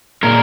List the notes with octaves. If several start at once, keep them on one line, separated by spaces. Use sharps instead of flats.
A#2 G#3 A#4